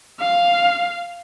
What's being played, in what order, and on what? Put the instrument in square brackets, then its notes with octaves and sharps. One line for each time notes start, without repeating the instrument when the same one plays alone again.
[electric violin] F5